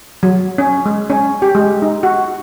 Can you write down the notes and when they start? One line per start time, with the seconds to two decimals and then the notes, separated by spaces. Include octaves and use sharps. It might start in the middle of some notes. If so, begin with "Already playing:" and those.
0.23 F#3
0.58 C#4
0.86 G#3
1.10 C#4
1.42 G4
1.55 G#3
1.82 D#4
2.03 F#4